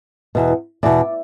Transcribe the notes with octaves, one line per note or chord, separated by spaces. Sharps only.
E2 B2
E2 B2 D5